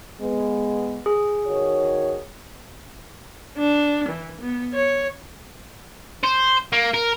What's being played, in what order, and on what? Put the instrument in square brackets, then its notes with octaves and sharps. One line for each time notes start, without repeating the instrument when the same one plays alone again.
[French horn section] G#3 B3
[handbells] G#4
[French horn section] D#3 F#4 C#5
[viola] D4
E3
B3
C#5
[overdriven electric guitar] C5
A#3
A#4